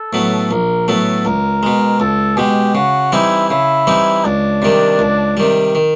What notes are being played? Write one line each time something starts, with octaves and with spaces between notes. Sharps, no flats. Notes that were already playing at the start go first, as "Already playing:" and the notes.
Already playing: A4
A2 F#3 B3
A#1 A#4
A2 F#3 B3 A4
C#2 A#4
B2 G#3
C#2 A4
B2 G#3 G4
C#3 F#4
E3 G3 C4 D#4 E4
C#3 E4
E3 G3 C4 D#4
C#2 D4
C3 D#3 G3
C#2
C3 D#3 G3
D#3